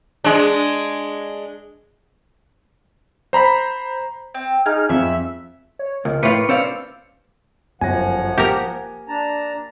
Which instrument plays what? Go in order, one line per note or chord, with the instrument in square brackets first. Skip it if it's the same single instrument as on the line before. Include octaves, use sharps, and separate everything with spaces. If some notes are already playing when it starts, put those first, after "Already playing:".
[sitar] G#3 D4
[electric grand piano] C5 A#5 B5 B6
[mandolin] C4
[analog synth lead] D#4 [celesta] G#4 G#5 G#6 [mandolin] F6
[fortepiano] F2 [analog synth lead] E5
[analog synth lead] C#5
[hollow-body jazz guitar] C#2 [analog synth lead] A#4
[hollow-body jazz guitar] A2 [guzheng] F4 B4 [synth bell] C#6 D6 C#7
[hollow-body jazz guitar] C#4 C5 D5 [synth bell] F5 E6 C#7
[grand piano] G1 F#2 A#6 [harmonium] F3 F#5 [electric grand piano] G#5
[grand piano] A#3 [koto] G4 A#4
[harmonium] D4 A5 A#5